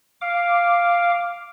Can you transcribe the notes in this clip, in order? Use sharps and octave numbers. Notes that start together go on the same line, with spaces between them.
F5 D6